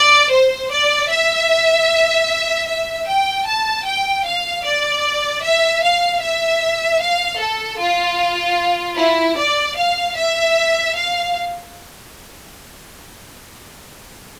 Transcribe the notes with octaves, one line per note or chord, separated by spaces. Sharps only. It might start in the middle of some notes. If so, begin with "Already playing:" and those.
Already playing: D5
C5
D5
E5
E5
G5
A5
G5
F5
D5
E5
F5
E5
F5
A4
F4
E4
D5
F5
E5
F5